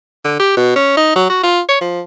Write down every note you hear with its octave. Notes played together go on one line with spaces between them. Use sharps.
D3
G4
B2
C#4
D#4
F#3
F#4
F4
C#5
F3